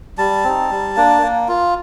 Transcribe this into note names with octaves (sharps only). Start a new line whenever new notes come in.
G3 A5
C4 D#4
G3
A#3 D4
A#3
F4